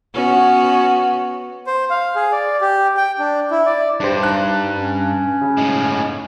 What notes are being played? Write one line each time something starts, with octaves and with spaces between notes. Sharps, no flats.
B3 C#4 F#4
C5
F5
G#4
D5
G4
G5
D4
E4
D5
G2 D4 G4 C5
D#4 A5 F#6
C#4
C#3
A2 G#3